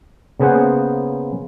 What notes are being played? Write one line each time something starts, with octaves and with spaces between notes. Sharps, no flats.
C#3 A#3 B3 G#4 C5 F#5